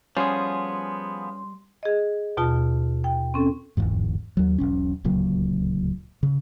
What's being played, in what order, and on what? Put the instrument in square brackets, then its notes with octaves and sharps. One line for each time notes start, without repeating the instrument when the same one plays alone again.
[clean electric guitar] F3 B3 G#4 [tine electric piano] G3 C7 [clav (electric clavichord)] C#4 [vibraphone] C6
[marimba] G#4 D#5
D#2 B2 F4 A5
G5
C4 C#4 A4
[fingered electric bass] D1 G1 E2 G#2
D#2 F#3
E1 B1 C#4
D1 C#2 A#2 F#3
C#3